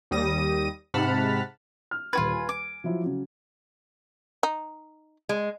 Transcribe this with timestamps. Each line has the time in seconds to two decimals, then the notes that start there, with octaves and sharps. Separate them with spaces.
0.11 D#2 G3 D#6 A#6 D#7
0.94 G#2 C3 F#5 A5 B5 F6
1.91 F6
2.13 D#1 F4 F#4 B4 G#6
2.31 G#5
2.49 D6
2.84 F3 F#3 E4
3.03 C#3 F#3
4.43 D#4
5.29 G#3